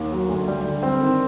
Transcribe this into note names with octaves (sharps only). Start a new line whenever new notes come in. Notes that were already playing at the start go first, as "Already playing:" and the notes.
Already playing: D#2
F#3
D2
G3
D3
C4
D#3